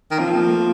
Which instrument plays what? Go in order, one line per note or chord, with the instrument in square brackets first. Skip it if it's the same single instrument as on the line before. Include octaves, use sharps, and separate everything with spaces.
[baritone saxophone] D#3
[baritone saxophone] F3 [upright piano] C4
[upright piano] A#3
A3